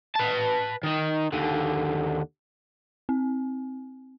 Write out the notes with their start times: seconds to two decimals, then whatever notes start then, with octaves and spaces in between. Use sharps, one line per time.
0.15 B4 A5
0.83 D#3 D#4
1.32 D#2 D3
3.09 C4